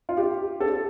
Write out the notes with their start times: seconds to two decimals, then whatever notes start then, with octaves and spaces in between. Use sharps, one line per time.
0.09 F4
0.17 G4
0.61 A4